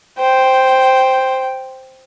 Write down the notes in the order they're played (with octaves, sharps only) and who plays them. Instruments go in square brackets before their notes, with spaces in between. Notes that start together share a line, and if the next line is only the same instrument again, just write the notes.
[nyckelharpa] C5 [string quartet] G5